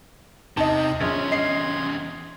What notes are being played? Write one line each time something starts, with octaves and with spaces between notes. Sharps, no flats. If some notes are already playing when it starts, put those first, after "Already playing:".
E2 C3 D#4 D#5 A5
A#1 E2 C#4 C6 G#6
D#5 C7